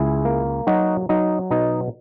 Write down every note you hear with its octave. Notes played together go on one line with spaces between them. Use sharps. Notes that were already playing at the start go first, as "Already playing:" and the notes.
Already playing: C#2 E4 G#4
A#3
F#3 D#4 F#4
F#3 D#4
B2 D#4